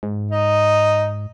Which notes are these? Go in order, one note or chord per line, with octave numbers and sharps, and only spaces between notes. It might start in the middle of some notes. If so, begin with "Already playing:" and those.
G#2
D#4